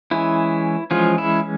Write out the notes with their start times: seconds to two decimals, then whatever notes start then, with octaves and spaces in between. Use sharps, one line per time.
0.11 E3 G#3 C#4 E4
0.91 E3 F3 G#3 C#4 F4
1.18 E4